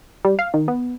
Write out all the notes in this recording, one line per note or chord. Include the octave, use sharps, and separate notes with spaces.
G3
F5
D#3
B3